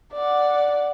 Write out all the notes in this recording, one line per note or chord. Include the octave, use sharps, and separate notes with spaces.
D5 F#5